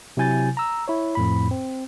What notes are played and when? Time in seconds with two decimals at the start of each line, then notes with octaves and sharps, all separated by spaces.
0.17 C3 F#3 E4 G#5 G6 A6
0.57 A#5 E6
0.88 E4 C#5
1.15 F2 A2 B5
1.51 C4